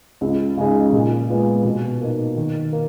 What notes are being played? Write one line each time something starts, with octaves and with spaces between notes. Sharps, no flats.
C#2
C#3 G#3 D#4 G#4
A#2
G#3 B3 F4
B2
A#3 D#4
D#3
A#3